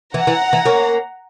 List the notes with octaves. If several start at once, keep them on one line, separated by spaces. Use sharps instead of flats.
E3 F#5 A#5
E3
E3
A#3 C#4